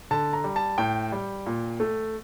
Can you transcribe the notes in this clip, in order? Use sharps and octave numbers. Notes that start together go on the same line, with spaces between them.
D3 A5
A#5
G3
A5
A2 G5
G3
A#2
A3